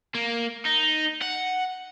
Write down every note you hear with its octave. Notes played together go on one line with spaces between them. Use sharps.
A#3
D#4
F#5